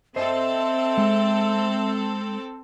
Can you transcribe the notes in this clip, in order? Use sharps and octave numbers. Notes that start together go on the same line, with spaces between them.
C4 A4 C5 D#5 E5
G#3